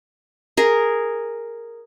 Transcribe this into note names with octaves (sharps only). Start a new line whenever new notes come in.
G#4 A#4